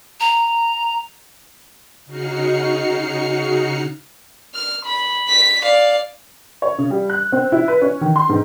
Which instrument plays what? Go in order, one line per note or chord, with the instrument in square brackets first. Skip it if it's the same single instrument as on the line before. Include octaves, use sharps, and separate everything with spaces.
[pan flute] A#5
[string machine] C#3 D#4 F#4 F6 C7 C#7
[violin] F6
B5
B6
D5 F5
[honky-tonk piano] C#5
C#3
G3
F#6
C4
E4
B4
C#4
D#3
C6
G#2